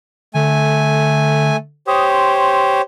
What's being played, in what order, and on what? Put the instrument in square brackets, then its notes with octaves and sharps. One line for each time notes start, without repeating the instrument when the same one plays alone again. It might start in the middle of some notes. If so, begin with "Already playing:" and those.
[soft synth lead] D3 [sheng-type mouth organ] A3 G#5
[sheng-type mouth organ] G4 C5 C#5 [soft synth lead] D#6
[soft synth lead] C6